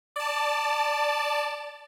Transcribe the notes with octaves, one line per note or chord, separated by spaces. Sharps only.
D5 A5